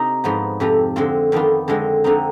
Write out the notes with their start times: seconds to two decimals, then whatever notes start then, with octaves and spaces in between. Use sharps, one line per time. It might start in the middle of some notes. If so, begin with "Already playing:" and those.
Already playing: C3 D#4
0.24 G#2 F3 B3
0.60 F2 C3 F3
0.96 D3 G#3 C4 F4
1.32 F2 D#3 B3 D4 F4
1.68 D3 F3 G#3 C4 F4
2.04 D3 F3 C4 D#4